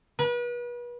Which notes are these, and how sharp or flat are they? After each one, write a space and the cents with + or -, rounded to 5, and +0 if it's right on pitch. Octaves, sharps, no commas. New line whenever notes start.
B4 -35